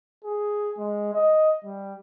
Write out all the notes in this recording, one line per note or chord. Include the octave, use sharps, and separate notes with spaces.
G#4
G#3
D#5
G3